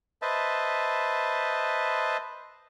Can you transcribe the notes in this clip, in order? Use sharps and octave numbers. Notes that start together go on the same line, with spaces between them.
B4 C5 D#5 E5 A5